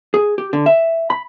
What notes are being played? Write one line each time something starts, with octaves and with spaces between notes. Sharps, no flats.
G#4
G4
D3
E5
B5